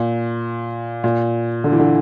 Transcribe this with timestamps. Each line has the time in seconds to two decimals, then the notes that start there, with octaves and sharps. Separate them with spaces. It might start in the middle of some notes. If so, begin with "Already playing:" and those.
Already playing: A#2
1.04 A#2
1.64 D3
1.72 E3
1.79 D3